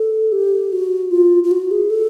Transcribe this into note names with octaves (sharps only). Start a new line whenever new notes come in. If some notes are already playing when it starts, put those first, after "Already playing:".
Already playing: A4
G4
F#4
F4
F4
F#4
G#4
A4